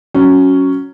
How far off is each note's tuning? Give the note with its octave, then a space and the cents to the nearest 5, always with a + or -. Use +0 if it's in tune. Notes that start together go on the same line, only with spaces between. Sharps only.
F#3 +0 C#4 +0